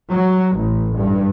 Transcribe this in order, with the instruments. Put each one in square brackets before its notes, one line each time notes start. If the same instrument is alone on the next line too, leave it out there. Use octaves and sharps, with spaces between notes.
[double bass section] F#3
A1
G2